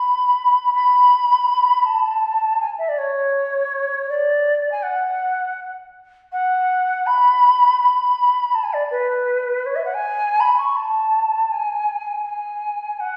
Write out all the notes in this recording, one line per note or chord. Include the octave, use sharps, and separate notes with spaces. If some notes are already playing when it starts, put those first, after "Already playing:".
Already playing: B5
B5
A5
G#5
E5
D5
C#5
D5
G#5
F#5
F#5
B5
B5
A5
G#5
D5
B4
C#5
E5
F#5
G#5
B5
C#6
A5
G#5
G#5
F#5